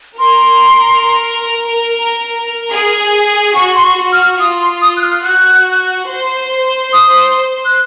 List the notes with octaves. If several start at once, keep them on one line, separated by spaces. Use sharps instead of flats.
A#4 C6
G#4
F#4 C#6
C6
C#6
F#4
F6
F4 D#6
C6
D#6
F#6
F6
F#4 F#6
C5
D#6
F#6